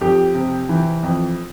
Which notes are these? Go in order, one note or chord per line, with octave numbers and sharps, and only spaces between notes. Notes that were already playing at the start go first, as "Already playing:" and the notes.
F2 G4
C3
E3
F2